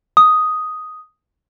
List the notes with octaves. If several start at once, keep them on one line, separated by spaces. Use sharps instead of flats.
D#6